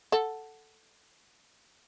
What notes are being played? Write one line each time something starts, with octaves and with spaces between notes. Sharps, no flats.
A4 F#5